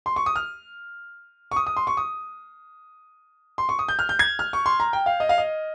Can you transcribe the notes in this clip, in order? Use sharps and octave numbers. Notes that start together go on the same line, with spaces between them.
C6
C#6
D#6
F6
C#6
D#6
D#6
C6
C#6
D#6
C6
C#6
D#6
G6
F6
G6
G#6
F6
C#6
C6
A#5
G5
F5
D#5
F5
D#5